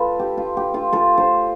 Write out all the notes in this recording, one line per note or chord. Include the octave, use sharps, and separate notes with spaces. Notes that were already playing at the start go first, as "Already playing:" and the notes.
Already playing: F4 A4 B4
G4
F4
G4
F4 A4
F4 A4
A4 C5